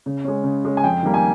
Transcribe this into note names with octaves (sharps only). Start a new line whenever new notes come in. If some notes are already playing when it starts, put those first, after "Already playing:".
C#3
G#3 C#4
C#3
G#3 C#4
G#5
F2 G5
D#3 G3 A#3
G#5